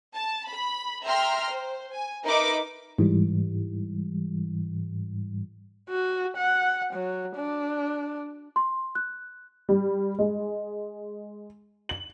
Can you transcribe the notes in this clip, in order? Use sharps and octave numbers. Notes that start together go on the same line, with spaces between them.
A5
B5
E5 G5 A#5 C6 F6
C5
G#5
D#4 A#4 B4 E5 D6
G#2 E3 G3
F#4
F#5
F#3
D4
C6
F#6
G3
G#3
F#7